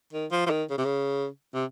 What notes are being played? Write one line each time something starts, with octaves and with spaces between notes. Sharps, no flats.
D#3
F3
F3
D#3
C#3
C3
C#3
C3